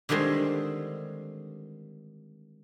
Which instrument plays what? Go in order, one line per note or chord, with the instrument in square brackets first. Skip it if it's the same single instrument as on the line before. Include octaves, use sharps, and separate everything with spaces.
[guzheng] D3 D#3 G3 G#3 C4